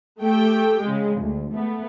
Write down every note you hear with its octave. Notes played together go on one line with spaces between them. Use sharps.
A3 G4 G5
C#3 G#3
D2
A3 B3